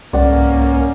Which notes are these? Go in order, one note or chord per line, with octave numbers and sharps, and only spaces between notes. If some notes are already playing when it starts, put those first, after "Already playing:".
C2 G#2 A#3 C#4 D5 F#5